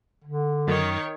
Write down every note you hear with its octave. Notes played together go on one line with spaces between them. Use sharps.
D3
F#2 D#3 C#5